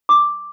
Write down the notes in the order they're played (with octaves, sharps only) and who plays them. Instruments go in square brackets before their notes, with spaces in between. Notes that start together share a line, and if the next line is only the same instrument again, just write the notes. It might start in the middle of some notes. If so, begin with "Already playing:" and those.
[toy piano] D6